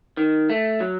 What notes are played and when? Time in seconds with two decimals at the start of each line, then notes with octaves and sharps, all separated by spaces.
0.17 D#3
0.50 A3
0.80 F#3